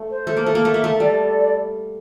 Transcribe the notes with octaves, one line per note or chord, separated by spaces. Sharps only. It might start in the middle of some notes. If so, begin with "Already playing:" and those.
Already playing: A3
C5
A3 A4
A#3
A3 A4
A#3
A3 E5
A#3
A3 A4
G3 D5
A4
D5